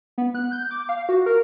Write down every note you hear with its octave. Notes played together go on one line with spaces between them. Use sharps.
B3
F#6
G6
D6
F5
F#4
A#4